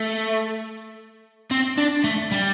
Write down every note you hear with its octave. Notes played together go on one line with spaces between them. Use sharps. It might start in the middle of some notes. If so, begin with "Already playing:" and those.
Already playing: A3
C4
D4
A3
G3